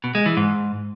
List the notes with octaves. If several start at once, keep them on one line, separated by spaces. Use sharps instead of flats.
B2
G#3
E3
G#2